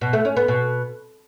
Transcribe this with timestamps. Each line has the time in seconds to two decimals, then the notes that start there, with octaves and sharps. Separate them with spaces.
0.01 B2
0.13 A3
0.25 C#4
0.37 B3
0.48 B2